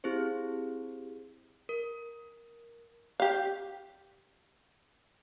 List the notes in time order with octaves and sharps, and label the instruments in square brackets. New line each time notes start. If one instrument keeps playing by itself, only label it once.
[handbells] C4 E4 G4 G#4 C5
A#4
[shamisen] G4 F5